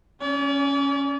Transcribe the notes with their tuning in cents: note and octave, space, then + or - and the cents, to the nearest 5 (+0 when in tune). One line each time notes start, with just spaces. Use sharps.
C#4 +0 D5 -45